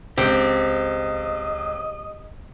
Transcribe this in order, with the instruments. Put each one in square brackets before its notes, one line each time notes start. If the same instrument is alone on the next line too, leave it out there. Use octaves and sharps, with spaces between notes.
[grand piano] C#2 [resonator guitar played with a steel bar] C4 [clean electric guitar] G4 [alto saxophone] D#5